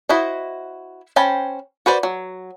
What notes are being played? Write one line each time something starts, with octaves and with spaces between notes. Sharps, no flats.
E4 F#4 C5 D#5
C#4 C5 G5 A5 B5
F#4 B4 C5 D5
F#3